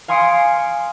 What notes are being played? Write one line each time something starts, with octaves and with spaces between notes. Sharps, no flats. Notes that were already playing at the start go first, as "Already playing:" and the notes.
F5 G#5 C6 D#6 C#7 D7